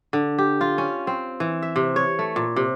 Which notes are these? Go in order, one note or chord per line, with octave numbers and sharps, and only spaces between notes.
D3
G4
F4
C#4
C4
E3
E5
C3
C#5
A3
A#2
C3